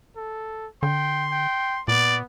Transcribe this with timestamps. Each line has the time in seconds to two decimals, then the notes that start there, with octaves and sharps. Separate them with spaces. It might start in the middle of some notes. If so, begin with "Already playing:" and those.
0.17 A4
0.83 D3 G5 C6
1.32 G5
1.88 A#2 B3 D5